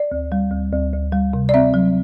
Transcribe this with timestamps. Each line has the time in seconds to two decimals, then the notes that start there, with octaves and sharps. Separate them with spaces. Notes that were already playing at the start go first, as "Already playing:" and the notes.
Already playing: D5
0.12 D2
0.32 G3
0.51 D2
0.72 D2
0.93 D2
1.12 G3
1.33 C3
1.49 D5
1.54 C4 E5
1.74 F#3